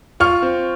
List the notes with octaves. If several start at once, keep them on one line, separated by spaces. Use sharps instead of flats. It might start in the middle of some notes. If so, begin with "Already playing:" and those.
F4 C#6 F6
C4